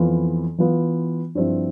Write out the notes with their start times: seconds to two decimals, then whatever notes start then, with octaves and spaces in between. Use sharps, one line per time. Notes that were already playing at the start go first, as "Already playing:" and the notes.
Already playing: F2 E3 B3 F4
0.58 E3 B3 F4
1.35 G2 F3 C4 E4